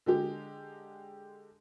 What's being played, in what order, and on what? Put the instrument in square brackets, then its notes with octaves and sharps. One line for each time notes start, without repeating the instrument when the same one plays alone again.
[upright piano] D3 G#3 G4